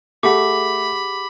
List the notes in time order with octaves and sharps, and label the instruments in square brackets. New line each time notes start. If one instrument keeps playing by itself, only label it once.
[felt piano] A3 [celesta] G4 G#4 F#5 [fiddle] B5 [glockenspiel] D6